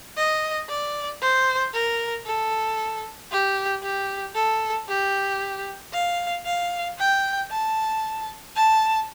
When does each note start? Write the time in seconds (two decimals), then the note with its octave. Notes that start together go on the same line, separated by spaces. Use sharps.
0.17 D#5
0.68 D5
1.21 C5
1.73 A#4
2.26 A4
3.31 G4
3.83 G4
4.35 A4
4.88 G4
5.92 F5
6.45 F5
6.99 G5
7.50 A5
8.56 A5